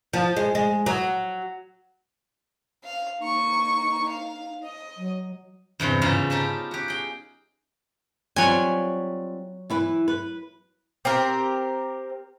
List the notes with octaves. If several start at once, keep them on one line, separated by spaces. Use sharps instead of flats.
F3
G#3
G#3
F#3
F5
A#3 D#4 C#6
F5
D#5
F#3
E2 G2 C3 C6
G#2 C#3 C#4 D#4 F4
D#4 G4 A5 B5
F#4 G4
G#4 G5
F#3 G3 C4 F4 G#5
E3 E4 B4
B4
C4 G4 A#4